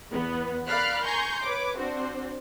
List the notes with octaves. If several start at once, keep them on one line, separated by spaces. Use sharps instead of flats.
E2 B3
A#4 D5 F5 B5 F6 F#6
G#5 A#5 C6 C#6 G6
B4 C#5 D6
C4 D4 F#4 C5